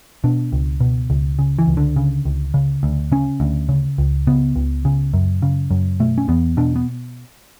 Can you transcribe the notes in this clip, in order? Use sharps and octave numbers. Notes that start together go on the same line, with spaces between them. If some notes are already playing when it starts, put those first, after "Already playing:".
B2 D4
C#2
B2
C#2
C#3
E3
C#2
D3
C#3
C#2
C#3
D2
C#3 C#4
D2
C#3
C#2
C#3 B3
C#2
C#3
F#2
C#3
F#2
B2 A3
C#4
E2 B3
B2 D4
B3